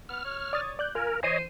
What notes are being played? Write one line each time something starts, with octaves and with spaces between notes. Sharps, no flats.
B3 F6
C#5
D5 D#6 A6
D5 F#6 G6
F4 A#4 G#5
E3 C5 C#5 D#5 D#7